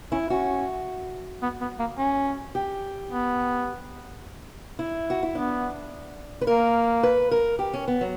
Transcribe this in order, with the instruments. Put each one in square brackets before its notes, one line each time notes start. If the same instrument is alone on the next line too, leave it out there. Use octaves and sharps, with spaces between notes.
[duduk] C#4 [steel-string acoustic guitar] E4
[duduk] C#4 [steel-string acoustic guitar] F#4
[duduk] B3
B3
A#3
C#4
[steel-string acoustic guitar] G4
[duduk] B3
[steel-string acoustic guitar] E4
F#4
E4
[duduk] B3 [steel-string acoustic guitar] D4
[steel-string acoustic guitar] B4
[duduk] A#3 [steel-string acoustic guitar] A#4
[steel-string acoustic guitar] B4
A#4
G4
C#4
B3
F#3